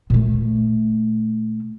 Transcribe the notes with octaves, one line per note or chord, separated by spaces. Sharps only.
A#2 A3